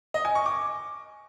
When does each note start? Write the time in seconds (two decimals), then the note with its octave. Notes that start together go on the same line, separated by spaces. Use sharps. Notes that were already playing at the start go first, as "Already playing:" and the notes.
0.14 D#5
0.25 G#5
0.35 C#6
0.46 D6